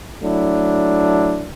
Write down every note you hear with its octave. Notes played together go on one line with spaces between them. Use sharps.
F#3 A3 D4 E4